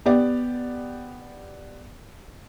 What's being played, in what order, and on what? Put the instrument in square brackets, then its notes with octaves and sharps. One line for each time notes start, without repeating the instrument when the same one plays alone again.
[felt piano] B3 G4 D5